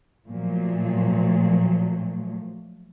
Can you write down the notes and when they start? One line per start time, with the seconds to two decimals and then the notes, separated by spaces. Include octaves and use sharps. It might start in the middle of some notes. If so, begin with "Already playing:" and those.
0.28 A#2 F3 F#3 A3